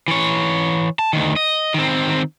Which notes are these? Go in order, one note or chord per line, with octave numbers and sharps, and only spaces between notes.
E3 C#5
A5
D2 D#3
D#5
D#3 C4